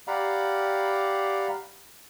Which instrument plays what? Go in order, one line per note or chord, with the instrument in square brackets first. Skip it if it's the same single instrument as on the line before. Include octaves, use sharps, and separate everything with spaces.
[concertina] G4 D5 F5 F#5 A#5 B5